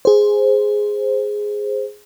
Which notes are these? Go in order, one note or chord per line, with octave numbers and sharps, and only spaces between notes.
G#4 C5